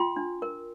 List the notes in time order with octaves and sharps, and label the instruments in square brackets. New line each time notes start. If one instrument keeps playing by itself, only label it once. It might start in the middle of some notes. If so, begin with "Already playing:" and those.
Already playing: [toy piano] F4 G5 C6
D4
A#4